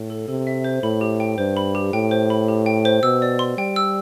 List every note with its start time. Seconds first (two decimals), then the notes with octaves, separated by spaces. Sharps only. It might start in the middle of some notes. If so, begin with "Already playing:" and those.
Already playing: A2
0.10 A4
0.28 C3 A4
0.47 E5
0.64 C5
0.83 A2 B5
1.01 G4
1.20 G5
1.38 G2 C5
1.57 B5
1.75 G4
1.93 A2 G5
2.11 C5
2.30 B5
2.48 G4
2.66 G5
2.85 C5
3.03 B2 E6
3.22 D5
3.39 C6
3.58 G3 G5
3.76 E6